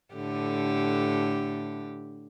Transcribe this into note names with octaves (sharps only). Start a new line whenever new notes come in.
A2 D3 G4